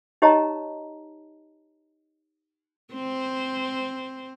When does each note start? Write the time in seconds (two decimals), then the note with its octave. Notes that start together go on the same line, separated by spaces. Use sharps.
0.22 D#4 G4 C#5 D#5 A5 A#5
2.94 C4 C5